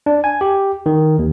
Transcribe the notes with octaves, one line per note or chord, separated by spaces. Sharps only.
D4
G#5
G4
D#3
D#2